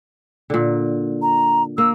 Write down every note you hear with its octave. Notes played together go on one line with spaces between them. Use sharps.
A#2 D3
A#5
A#3 E6